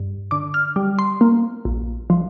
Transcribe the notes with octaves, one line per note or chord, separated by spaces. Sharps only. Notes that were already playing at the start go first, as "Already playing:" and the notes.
Already playing: G2
D3 D6
F6
G3
C6
A#3
A#1
F3